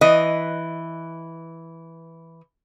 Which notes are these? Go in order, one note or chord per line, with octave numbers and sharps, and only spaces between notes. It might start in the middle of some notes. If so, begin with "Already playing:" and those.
E3 D#5